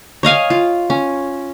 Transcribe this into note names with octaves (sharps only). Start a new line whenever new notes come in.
C#5 D#5 F5 G#5
F4
C#4